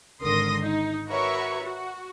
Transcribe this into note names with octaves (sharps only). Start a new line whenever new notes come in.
G#1 D3 A#4 C6 D#6 A#6
D#4
F#4 A#4 B4 C#5 E5 C#6
F#4